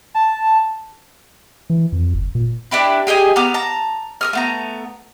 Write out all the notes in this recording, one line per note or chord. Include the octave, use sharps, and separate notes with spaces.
A5
E3
F2
F#1
A#2
D4 E4 G4 B4
G4 G#4 D#5 G#5
B3 A#5 D6 F6
A5 A#5
A#4 D#6 F6
A3 B3 A#5